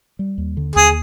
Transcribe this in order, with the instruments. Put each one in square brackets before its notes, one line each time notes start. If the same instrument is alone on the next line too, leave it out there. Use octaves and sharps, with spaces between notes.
[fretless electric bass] G3
D#2
D3
[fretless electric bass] D#2 [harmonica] G#4